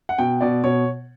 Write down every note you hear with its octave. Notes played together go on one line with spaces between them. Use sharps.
F#5
B2 G5
B2 D5
B2 C#5